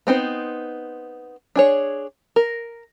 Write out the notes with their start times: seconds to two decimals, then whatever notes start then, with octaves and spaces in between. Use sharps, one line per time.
0.07 B3 C4 D#4 C5
1.56 D4 G#4 C#5
2.36 A#4